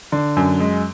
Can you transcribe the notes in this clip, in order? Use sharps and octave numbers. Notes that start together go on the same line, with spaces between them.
D3
F#2
G#3